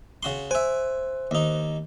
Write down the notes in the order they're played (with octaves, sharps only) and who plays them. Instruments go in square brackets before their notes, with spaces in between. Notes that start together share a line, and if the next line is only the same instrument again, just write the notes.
[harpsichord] C#3 F#4 C6
[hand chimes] C5 [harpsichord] E5 G#5
[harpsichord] D#2 D#4